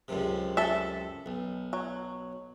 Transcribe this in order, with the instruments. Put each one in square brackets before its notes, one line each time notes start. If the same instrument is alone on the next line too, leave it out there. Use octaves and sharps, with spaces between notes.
[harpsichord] C#2 F#2 C3
[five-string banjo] A4 E5
[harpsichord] B1
[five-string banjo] F#3